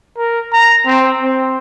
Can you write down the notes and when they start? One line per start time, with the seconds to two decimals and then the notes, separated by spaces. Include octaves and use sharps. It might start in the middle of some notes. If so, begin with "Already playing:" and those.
0.17 A#4
0.53 A#5
0.86 C4
1.23 C4